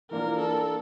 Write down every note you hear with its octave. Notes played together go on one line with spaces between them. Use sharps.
E3 A#3 D4 F4 A#4
A4